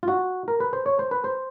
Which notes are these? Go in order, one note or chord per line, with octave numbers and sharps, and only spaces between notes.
F4
F#4
A#4
B4
C5
C#5
C5
B4
C5